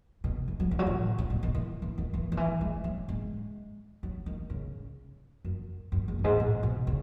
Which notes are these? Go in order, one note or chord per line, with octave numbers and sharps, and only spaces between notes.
B2
E3
F#3
E3
F#3
E3
A2
A2
B2
D#3
E3
E3
D#3
E3
D#3
E3
G#3
F#3
G#3
F#3
D#3
C#3
F#2
F#2
E2
F#2
G#2
A2
B2
C#3